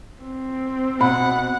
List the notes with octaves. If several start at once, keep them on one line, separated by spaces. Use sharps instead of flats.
C4
B2 F#5 B5